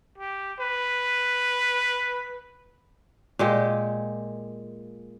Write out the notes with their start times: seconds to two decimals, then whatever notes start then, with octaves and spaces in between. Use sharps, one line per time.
0.18 G4
0.60 B4
3.39 A#2 G#3 G4